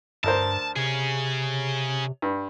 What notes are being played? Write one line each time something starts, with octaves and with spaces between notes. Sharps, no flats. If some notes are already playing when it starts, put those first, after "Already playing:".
D2 G2 A#4 C5 A5
C3 G#4 C#5
G2